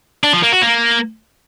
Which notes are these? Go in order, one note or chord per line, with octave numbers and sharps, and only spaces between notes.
D4
F3
A#3
F#4
A#3